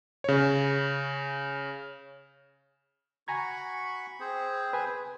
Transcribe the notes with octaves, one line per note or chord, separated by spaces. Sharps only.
C#3 C#5
F#4 G#5 A#5 B5 C#6 G#6
C4 G#4 C5
B4 G#5